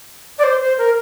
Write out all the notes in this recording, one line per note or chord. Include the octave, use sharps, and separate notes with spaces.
D5
C5
C5
A#4